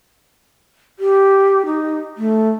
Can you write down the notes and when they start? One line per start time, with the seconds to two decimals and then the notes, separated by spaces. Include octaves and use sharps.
0.99 G4
1.66 D#4
2.17 A3